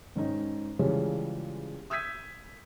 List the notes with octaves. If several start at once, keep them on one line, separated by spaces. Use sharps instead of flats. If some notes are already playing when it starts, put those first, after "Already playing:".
G#2 D#3 C#4 D#4
C#3 E3 F3 G3 G#3 C#4
D#6 E6 G6 G#6 B6 D#7